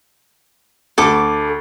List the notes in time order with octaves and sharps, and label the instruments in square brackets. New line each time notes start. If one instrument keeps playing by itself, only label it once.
[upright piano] D2 [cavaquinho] A4 D6